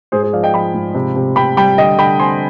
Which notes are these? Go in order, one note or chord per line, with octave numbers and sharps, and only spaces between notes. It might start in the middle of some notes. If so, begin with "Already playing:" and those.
G#2 G#4 C5
G#4 C5
F3 D5 F5
D#5 G5
F3 G5 B5
G#2
C3
C3
C3 G5 B5
G3 G5 B5
D3 D#5 G5
D3 G5 B5
C4 G#5 C6